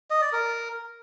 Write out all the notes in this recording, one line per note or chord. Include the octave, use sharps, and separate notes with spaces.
D#5
D5
A#4